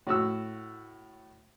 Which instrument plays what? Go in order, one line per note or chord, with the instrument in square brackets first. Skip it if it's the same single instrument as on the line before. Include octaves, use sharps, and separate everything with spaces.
[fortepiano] A2 F#4 E6